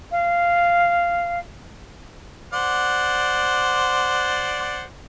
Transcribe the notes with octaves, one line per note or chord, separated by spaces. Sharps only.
F5
C5 D5 F#5